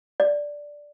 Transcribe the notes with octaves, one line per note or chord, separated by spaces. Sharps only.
D5